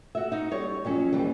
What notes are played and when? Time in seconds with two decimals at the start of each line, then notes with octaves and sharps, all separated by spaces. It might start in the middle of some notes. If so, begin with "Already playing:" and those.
0.15 F#4 E5
0.32 D#4 F#4
0.52 G3 C#5
0.85 F2 F#3 C#4
1.13 D#2 E3 G3